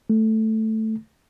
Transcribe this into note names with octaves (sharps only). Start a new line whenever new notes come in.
A3